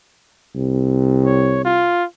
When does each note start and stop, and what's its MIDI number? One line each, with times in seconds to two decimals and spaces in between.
0.55 1.94 36
1.25 1.64 73
1.65 2.04 65